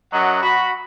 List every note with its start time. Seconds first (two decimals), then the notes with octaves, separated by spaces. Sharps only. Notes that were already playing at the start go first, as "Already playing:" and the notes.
0.11 F#2 F#3 D#5 F#5
0.41 F#4 B5